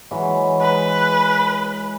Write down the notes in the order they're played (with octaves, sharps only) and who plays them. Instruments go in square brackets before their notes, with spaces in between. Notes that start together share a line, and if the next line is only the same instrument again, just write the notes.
[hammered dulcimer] E3 F#3 G#3
[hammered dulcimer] G#3 [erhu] B4